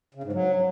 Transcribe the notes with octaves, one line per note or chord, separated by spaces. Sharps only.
C#3
G#2
F#3